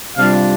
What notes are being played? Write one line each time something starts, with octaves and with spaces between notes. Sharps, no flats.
C3 G3 D4 F4 F5